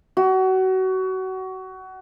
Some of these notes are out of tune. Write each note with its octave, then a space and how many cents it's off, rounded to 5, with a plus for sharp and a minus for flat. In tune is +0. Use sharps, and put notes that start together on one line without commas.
F#4 +25